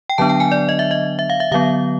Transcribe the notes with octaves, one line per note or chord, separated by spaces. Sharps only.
G5
D3 F#3 B3 D4 A5
G5
G#5
D5
D#5
E5
D#5
E5
F5
E5
D3 F#3 B3 F5